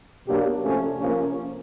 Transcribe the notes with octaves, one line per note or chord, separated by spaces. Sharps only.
B2 F#3 A#3 D4 G4
C3 F3 A3 C#4
C3 F3 A#3 C#4